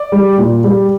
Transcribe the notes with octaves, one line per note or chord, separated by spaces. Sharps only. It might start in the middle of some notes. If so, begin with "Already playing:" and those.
Already playing: D5
G3
A#2
G3